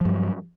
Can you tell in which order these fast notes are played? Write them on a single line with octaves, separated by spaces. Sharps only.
F3 G2 F#3